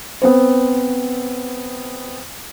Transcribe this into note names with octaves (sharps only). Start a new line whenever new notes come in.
B3 C4 C5